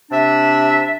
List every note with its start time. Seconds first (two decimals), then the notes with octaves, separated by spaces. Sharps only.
0.11 C3 D4 E5